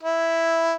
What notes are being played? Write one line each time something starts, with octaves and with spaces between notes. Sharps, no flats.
E4